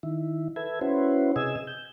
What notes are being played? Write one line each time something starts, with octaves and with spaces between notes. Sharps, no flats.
D#3 E4
A4 B4 E5 G#6
C#4 E4 F#4 B4 C5
C3 G#4 D#5 E6 G#6
G6